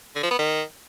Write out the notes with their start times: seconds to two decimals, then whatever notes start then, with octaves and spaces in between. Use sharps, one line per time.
0.15 D3
0.23 F3
0.31 B3
0.39 D#3